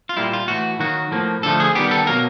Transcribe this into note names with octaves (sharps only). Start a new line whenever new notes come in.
F4
A#2 G3 A#3 E4
F4
A2 E3 A3 F#4
D#3 F#3 A#3 F#4
A2 F3 A#3
D3 F3 A3 A4
G#4
D#3 G3 B3 G4
A4
B2 F#3 A#3 A#4